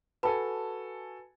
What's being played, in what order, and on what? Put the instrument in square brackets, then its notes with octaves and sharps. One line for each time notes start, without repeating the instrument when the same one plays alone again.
[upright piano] F#4 A4 G#5 [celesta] B4 A5 B5